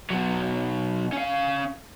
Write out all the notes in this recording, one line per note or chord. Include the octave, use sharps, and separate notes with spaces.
B2 F#3
C#4 F5